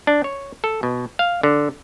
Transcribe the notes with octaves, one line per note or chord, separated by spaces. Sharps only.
D4
C#5
A4
B2
F5
D3